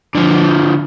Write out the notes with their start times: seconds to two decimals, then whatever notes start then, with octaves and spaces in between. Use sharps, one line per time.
0.15 D3 F3